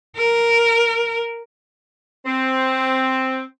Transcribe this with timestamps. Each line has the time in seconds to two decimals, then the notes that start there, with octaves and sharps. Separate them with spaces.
0.17 A#4
2.26 C4